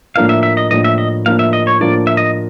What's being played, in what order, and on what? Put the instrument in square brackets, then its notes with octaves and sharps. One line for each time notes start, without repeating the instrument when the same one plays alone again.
[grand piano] A2 F3 A#3 D4 F4 [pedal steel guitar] F5
[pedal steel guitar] E5
E5
D#5
[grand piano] A2 F3 A#3 D4 F4 [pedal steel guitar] D#5
[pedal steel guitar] E5
D#5
[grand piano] A2 F3 A#3 D4 F4 [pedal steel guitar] F5
[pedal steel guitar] E5
D#5
C#5
[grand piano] A2 F3 A#3 D4 F4 [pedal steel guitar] D5
[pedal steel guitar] E5
D#5